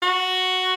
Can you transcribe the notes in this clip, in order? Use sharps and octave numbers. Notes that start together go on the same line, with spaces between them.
F#4